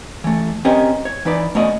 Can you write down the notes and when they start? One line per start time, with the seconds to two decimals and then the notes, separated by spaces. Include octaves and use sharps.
0.24 E3 A3
0.65 C4 C#4 G4 A#4 B4 D#5
1.05 C#5
1.25 E3 D#4 B4 D5
1.55 A3 B3 C#4 F#4 D5 D#5